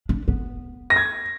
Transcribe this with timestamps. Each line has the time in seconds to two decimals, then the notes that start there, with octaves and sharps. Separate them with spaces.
0.09 D4
0.28 B3
0.90 A#6
0.96 G#6